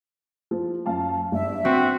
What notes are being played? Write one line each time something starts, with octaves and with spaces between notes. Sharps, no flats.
F3
F#2 F5 A5
G1 E5
C4 F#4 G5